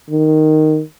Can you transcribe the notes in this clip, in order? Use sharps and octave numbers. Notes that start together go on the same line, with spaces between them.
D#3